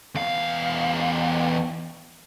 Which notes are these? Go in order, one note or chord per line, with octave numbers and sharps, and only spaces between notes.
E2 F5